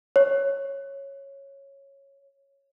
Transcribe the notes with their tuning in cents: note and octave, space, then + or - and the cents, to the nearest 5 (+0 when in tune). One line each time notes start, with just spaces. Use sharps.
C#5 -10